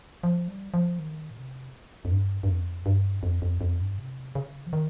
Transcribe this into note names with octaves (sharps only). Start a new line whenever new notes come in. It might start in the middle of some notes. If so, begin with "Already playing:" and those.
F3
G3
F3
D#3
A#2
C3
F2
G2
G2
F2
G2
F2
F2
F2
G2
C3
C#3
F3
D#3